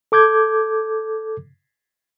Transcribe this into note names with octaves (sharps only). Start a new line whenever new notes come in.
A4 D6 G6 G#6